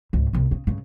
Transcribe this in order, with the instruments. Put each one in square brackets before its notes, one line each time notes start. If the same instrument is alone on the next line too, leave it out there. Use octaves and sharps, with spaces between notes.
[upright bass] C#2 G#2
G1 C2
C#3
G2 C#3